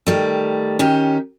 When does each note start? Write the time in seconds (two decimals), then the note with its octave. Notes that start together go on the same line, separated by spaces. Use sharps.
0.07 D#3 G3 A3
0.79 D#3 C#4 G4